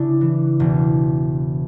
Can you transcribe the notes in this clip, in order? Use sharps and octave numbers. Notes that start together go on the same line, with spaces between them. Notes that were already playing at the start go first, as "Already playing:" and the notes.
Already playing: C#3 D4 E4
E3
E1